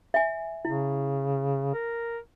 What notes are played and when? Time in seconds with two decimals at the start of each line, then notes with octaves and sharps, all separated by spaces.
0.14 E5 G#5
0.65 C#3 E4
1.74 A#4